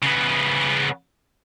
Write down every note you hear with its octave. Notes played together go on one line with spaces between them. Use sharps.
C#3 B3